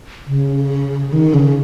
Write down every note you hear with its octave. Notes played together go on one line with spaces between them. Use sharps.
C#3
D#3
C#3